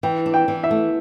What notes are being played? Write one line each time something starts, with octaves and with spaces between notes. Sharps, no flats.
E3 G5
D4
G5
E3
E5
A3